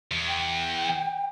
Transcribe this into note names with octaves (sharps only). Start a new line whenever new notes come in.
E2
G5